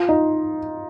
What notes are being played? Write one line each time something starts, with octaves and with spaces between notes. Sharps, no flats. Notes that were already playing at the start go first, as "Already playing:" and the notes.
Already playing: F4
D#4